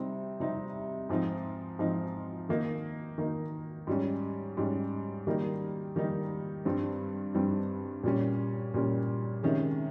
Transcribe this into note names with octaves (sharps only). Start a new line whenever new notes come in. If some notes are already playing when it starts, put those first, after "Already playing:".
Already playing: C3 G3 C4 D#4
C3 G3 C4 D#4
G#2 F3 C4 D#4
G#2 F3 C4 D#4
D#3 A#3 D#4
D#3 A#3 D#4
G#2 G3 C#4
G#2 G3 C#4
D#3 G3 A#3 D#4
D#3 G3 A#3 D#4
G2 G3 C4
G2 G3 C4
A#2 G3 C#4
A#2 G3 C#4
C3 D#3 G#3 C#4